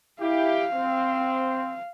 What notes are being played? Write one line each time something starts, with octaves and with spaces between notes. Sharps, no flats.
E4 G4 F5
C4